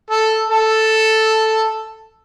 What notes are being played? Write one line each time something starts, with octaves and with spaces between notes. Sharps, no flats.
A4
A4